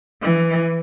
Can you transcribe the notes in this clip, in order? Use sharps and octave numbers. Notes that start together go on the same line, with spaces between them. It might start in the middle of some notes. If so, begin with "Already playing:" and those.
E3